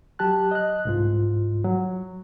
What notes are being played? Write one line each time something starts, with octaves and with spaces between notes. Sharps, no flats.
F#3 G4 A5 F#6
D#5 F#6
C2 G#2 F4
F#3